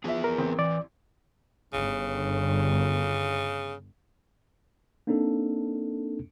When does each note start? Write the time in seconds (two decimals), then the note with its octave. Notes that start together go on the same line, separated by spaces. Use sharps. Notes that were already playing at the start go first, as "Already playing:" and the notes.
0.04 F3 B3 G#4 B4 E5
0.24 A#4
0.38 A1 C4
0.59 E3 D5
1.73 G1 C#3
5.07 A#3 C4 D4 D#4 A4